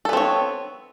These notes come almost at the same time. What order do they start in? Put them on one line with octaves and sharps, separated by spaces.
A4 B3 C4 C#5